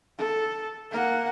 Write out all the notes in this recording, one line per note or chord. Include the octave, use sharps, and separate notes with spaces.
A4
A#3 F#5